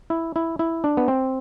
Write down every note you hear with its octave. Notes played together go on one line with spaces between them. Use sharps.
E4
E4
E4
D4
B3
C4